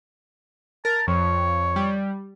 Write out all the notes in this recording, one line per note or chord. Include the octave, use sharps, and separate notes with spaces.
A#4 A5
F2 C#5
G3